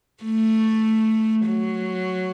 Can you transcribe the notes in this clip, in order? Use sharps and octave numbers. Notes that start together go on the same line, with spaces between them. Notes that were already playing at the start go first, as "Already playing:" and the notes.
A3
F#3